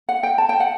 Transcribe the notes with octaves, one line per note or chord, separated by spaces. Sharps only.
F#5
G5
A5
G5
F#5